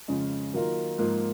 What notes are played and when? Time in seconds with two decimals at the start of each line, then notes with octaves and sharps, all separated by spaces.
0.08 F2 C#3 F3 G#3 C#4
0.54 D#3 F#3 A#3 F4 A#4
0.98 G#2 F3 A#3